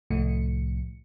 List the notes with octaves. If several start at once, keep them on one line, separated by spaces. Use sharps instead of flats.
C2 A2 F3 A3 C#7